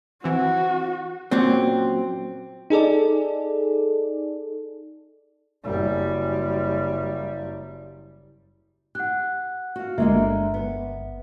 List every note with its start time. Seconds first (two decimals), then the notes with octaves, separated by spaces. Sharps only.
0.24 E3 C4 F#4
1.31 F#2 A#2 F#3 C4
2.70 D#4 G#4 A4 D5
5.64 F#1 G3
8.95 G4 F#5 F#6
9.76 F#4 F5
9.98 G1 D3 G#3 A#3 E5
10.54 B3